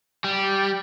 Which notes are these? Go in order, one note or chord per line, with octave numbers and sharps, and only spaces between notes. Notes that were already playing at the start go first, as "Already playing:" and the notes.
G3